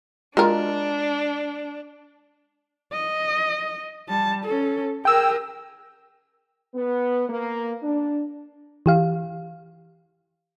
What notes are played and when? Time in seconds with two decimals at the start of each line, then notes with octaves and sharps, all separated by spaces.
0.37 G#3 D4 F4 A#4
2.93 D#5
4.09 G3 A5
4.45 C#4 A4
5.05 G#4 A#4 G5 E6
6.75 B3
7.29 A#3
7.82 D4
8.86 E3 G4 F5